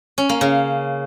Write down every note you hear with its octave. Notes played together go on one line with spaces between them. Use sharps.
C#4
A#3
C#3